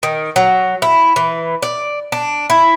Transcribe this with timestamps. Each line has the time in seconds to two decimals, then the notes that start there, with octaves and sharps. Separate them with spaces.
0.03 D#3
0.36 F#3
0.82 E4
1.16 E3
1.62 D5
2.12 D4
2.50 E4